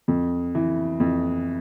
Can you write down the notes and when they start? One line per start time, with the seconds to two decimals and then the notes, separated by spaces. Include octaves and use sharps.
0.08 F2
0.55 E3
1.00 F2